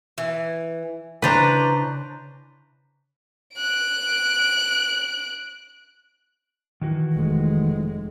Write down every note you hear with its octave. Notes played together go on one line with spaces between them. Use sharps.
E3
C#3 E3 D4 B4 C5 A#5 A6
F#6 D7
D#3 E3 F#4
F1 G#3